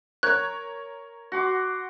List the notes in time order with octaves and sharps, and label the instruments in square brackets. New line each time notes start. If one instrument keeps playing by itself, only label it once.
[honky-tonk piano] A#4 C#5 G#6 [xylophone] F#6
[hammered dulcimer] F#4 C6 D6